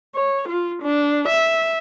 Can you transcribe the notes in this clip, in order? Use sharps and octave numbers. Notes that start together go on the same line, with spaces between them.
C#5
F4
D4
E5